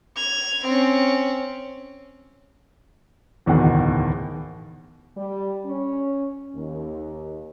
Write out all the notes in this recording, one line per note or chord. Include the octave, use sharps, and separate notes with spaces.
G#6 F7
C4 C#4
D1 E2 B2 D#3 F#5
G3
C#4
D#2